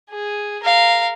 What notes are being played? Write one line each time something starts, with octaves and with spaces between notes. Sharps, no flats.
G#4
A#4 F5